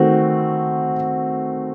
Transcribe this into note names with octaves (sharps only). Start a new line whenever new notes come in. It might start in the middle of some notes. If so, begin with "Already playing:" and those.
Already playing: D#3 A3 C4 F#4